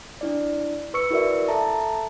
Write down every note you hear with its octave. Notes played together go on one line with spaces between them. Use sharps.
D4 E4 D5
B4 C#6 E6 C#7
E4 F#4 A#4 D5 E5
A4 E5 A5 A#5